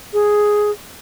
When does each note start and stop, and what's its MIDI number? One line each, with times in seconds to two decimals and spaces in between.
0.13 0.71 68